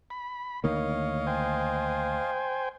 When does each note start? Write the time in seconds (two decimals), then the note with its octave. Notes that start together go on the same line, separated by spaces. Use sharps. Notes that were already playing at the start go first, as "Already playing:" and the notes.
0.10 B5
0.64 D2 D#3 A#3 C#5 D#5 F5
1.27 C5 G5 G#5